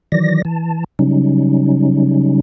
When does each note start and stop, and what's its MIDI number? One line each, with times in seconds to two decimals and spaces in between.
0.12 0.42 51
0.12 0.42 52
0.12 0.42 54
0.12 0.42 74
0.12 0.42 94
0.45 0.84 52
0.45 0.84 81
0.99 2.40 49
0.99 2.40 54
0.99 2.40 55
0.99 2.40 61
0.99 2.40 63